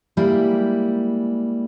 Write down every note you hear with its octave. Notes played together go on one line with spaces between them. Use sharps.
G3 G#3 A#3 E4